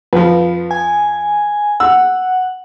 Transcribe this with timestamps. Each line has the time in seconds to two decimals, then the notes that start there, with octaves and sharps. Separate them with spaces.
0.13 F2 F3 B4
0.71 G#5
1.80 F#5 E6